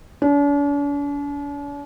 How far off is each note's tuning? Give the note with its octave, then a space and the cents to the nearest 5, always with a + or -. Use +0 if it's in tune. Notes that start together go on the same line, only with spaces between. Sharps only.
D4 -45